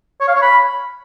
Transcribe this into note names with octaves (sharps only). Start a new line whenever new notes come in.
C#5
F5
C#5
B5